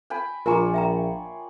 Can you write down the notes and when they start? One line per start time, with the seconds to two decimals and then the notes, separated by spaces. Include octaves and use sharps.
0.10 G5 G#5 B5
0.46 A#1 F4 A#4 C#5 D5 G#5 A#5
0.74 E5 G5 A#5